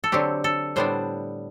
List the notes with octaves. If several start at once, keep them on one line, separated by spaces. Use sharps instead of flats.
A4
D3 F#3 C4 G4
A4
A2 G3 B3 D4 C5